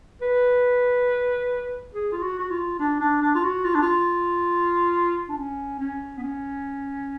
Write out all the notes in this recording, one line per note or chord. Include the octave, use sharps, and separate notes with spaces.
B4
G#4
F4
F#4
F#4
F4
D4
D4
D4
F4
F#4
F4
D4
F4
D4
C#4
C#4
B3
C#4